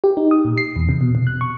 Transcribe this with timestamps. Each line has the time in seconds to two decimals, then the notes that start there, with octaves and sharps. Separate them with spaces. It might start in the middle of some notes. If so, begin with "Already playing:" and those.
0.04 G4
0.17 D#4
0.31 D#6
0.45 A#2
0.58 C7
0.76 E2
0.89 C3
1.01 B2
1.15 B2
1.27 F#6
1.41 C#6